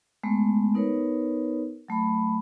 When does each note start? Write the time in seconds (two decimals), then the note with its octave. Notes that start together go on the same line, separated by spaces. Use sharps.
0.23 G#3 A3 B3
0.74 B3 D#4 A#4 B4 C#5
1.88 F#3 A3 B5